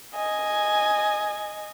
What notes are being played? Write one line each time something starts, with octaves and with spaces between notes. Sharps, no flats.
D#5 G#5